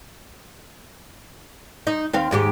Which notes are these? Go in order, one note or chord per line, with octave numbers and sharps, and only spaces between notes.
D#4
D#2 C4 F5
D#2 G#2 G4